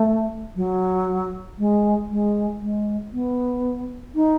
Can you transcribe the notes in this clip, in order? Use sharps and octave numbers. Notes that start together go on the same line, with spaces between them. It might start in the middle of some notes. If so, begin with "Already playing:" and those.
Already playing: A3
F#3
G#3
G#3
G#3
B3
D#4